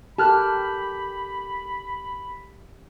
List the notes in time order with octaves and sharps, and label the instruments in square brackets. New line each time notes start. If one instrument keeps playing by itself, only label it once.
[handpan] G4 A4 A#4 [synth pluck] A5 F6 F#6 [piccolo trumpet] B5